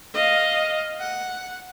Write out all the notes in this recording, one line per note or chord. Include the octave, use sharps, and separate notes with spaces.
D#5 F5
F#5